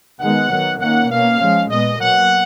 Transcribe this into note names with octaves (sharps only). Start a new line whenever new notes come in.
D#3 G#3 B3 F#5
D#3 F#3 B3
D#3 A#3 C#4 F#5
B2 A#3 C#4 F5
F3 G#3 C#4
A#2 G#3 B3 D#5
B2 F#3 A#3 F#5